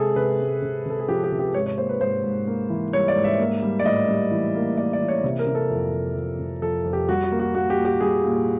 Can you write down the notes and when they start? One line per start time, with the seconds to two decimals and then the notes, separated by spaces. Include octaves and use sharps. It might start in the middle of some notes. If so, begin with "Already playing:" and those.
Already playing: C3 G#3 G#4 A4
0.16 C3 B4
0.39 G#3
0.62 C3
0.86 C3 A4
1.00 G#4
1.09 F3 G4
1.24 G4
1.32 C3
1.39 G4
1.54 G#2 C#5
1.66 C#5
1.78 A#3 C5
1.89 B4
2.01 G#2 C5
2.24 G#2
2.47 A#3
2.70 E3
2.93 G3 C#5
3.08 D5
3.16 G#2
3.24 E5
3.39 A#3
3.62 G3
3.79 D5
3.85 A2 D#5
4.08 G3
4.31 E3
4.55 A#3
4.77 A#3 D5
4.93 D5
5.01 E3
5.08 C#5
5.24 C3
5.39 A#4
5.47 C3
5.55 A4
5.70 F2
5.93 F2
6.16 F2
6.39 C3
6.62 F2 A4
6.85 F2
6.93 G4
7.09 G3 F#4
7.24 F#4
7.32 A#3
7.40 F#4
7.55 A#3 F#4
7.70 G4
7.77 A#2
7.85 G4
8.01 G3 G#4
8.24 A#2